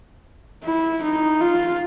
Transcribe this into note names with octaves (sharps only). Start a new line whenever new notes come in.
E4
D#4
F4